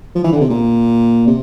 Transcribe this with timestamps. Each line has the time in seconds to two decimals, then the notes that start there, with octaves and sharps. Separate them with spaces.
0.15 F3
0.24 E3
0.32 D3
0.41 C3
0.50 A#2
1.27 C3